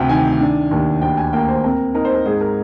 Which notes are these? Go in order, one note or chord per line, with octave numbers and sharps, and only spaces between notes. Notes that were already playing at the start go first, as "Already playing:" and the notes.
Already playing: D2 C3 G5
D#3 G#5
D4
D#2
D2 G5
G#5
A#3 G5
C5
C4 A#4
D#4 A#4
C5
A#4
G#2 G#4
A#4